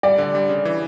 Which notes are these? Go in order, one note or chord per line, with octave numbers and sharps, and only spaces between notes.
G3 D5
D3
G3
C#3
E3